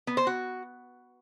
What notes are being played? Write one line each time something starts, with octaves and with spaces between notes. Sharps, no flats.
B3
C5
F#4